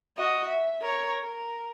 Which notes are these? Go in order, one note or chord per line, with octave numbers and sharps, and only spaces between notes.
F#4 D#5
E5
A#4 C#5
A#4